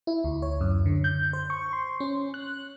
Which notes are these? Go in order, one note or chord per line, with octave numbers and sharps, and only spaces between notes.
E4
D2
C#5
F#2
D3
G6
C5
C#6
C6
C#4
F#6